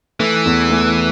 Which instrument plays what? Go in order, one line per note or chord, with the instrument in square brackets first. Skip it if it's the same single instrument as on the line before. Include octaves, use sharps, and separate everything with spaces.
[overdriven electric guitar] E3 [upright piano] A3
[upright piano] E2
A3